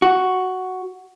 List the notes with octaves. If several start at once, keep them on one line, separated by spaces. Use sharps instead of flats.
F#4